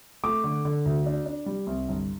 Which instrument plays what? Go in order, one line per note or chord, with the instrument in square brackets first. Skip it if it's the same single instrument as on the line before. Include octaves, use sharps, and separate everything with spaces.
[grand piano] A3 D6
D3
D3
D2
D4
D4
G3
C2
G1